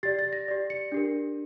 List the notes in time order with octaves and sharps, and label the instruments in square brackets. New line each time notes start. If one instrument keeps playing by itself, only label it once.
[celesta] G4 D5 A6
A6
A#6
G4 D5
C#7
D4 G4 A#4